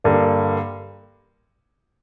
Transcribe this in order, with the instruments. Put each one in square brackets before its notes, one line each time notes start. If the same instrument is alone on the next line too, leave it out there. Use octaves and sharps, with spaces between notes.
[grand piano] G2 D3 G3 A#3